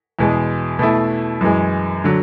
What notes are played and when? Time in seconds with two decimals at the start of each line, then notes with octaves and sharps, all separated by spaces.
0.19 E2 B2 G#3
0.79 B2 A3 E4
1.41 F#2 E3 G#3
2.04 D3 F#3